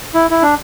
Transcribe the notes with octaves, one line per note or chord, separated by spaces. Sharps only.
E4
E4
D4